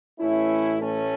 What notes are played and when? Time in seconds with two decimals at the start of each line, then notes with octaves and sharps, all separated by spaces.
0.20 A1 A2 E3 A3 C#4 E4
0.81 A3 C#4